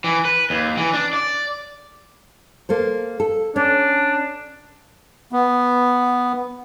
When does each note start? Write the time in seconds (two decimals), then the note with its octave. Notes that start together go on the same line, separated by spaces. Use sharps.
0.04 E3
0.25 B4
0.50 D#2
0.77 E3
0.93 D4
1.13 D5
2.69 A#3 A4 C5
3.20 A4
3.56 C#4 D4
5.32 B3